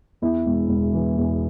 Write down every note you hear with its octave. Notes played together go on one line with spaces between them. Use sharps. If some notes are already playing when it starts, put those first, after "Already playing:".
E2 E4
E1
E1
E3
E2